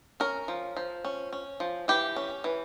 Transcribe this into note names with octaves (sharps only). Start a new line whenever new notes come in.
C#4 A#4
F3
F3
C#4
C#4
F3
E3 G4
C#4
E3